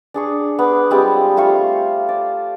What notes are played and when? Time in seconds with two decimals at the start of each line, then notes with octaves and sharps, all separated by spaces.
0.14 D4 G#4 C#6
0.59 B3 D6
0.90 G3 G#3 C4 F4
1.37 A3 F4 C5 C#6
2.09 D5